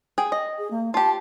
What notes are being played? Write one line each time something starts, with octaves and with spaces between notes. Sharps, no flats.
G#4 G5
D#5
G#4
A#3
F4 G4 A5